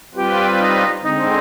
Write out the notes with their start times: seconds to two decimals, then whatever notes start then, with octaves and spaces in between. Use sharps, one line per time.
0.15 G3 C4 F4 G4 B4
0.59 D#4
1.02 D3 G#3 C4 D#4